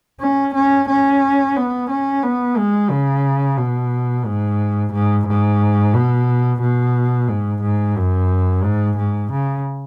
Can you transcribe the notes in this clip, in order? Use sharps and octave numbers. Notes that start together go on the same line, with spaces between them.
C#4
C#4
C#4
B3
C#4
B3
G#3
C#3
B2
G#2
G#2
G#2
B2
B2
G#2
G#2
F#2
G#2
G#2
C#3